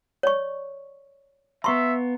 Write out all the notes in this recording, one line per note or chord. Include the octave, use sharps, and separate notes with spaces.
C#5 D5 C#6
B3 E5 F5 A#5 C6 C#6